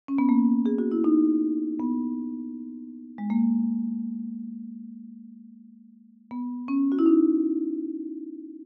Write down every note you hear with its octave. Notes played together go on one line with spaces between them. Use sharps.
C#4
B3
A#3
G#4
F#4
E4
D#4
B3
G#3
A#3
B3
C#4
F#4
E4
D#4